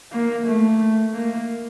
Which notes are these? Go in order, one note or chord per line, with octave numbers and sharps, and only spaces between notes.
A#3
A3
A#3